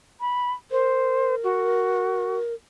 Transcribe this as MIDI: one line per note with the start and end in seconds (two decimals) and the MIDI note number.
0.21 0.52 83
0.71 2.54 70
0.71 1.35 72
1.44 2.37 66